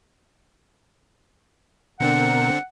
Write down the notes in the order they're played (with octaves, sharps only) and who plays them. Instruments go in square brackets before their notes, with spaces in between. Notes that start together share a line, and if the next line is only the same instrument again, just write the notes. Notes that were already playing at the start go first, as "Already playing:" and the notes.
[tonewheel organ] B2 A#4 [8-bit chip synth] D3 C4 D4 [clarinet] F#5